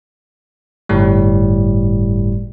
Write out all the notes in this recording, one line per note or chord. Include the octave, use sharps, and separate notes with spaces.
G1 A2 G3